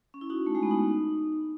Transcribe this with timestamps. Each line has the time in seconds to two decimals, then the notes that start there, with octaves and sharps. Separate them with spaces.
0.14 C#4
0.21 E4
0.30 D#4 F#4
0.46 A3
0.55 G#3
0.63 B3
0.71 D#4